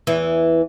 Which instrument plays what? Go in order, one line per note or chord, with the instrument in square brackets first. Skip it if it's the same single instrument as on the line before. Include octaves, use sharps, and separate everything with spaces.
[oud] E2 E3